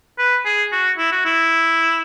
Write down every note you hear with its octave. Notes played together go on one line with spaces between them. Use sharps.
B4
G#4
F#4
E4
F#4
E4